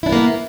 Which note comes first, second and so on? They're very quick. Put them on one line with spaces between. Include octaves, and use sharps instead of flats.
E4 D4 B3 A#3